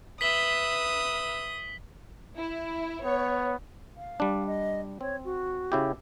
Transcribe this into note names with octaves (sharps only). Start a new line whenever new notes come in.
B4 E5 D#6 B6 F#7 G7
E4
B3 C#5
F5
G3 D4
D#5
C4 C#5
F#4
C#3 E4 G4